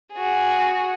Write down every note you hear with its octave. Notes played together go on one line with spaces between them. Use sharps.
F#4 G#4